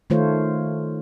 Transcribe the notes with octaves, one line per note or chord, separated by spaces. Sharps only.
D#3 A3 F4 C5 C#5